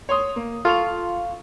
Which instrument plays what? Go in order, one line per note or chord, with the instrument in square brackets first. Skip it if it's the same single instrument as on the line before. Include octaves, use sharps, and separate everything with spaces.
[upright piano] C#5 C6 D#6
A#3
[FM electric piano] F4 [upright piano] A4 C#6 F7